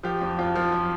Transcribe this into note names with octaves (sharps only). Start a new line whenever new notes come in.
F3 G4
F2
F2 F4
F3
F3